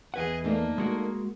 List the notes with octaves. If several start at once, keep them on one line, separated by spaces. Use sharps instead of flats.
E2 G#4 B4 D#5 F#5 G#5
A3 A#3 D4 D#4
G#3 F#4 A#4